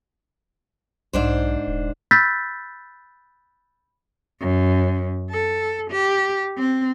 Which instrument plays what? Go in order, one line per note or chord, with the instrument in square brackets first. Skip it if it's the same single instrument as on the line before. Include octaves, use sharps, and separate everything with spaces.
[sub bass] B1 [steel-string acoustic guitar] G#2 D4 C5
[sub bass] D#1
[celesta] B5 E6 F#6 G6 A6 B6
[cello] F#2
A4
G4
C4